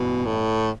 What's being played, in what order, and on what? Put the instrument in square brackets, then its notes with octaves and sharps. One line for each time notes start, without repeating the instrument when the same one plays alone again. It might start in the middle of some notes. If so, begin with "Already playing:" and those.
Already playing: [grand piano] A1 G2 E3 B3 [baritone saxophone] B2
[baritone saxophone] A2